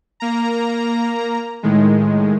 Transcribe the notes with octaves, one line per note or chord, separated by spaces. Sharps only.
A#3 A#5
A2 D#3 G#3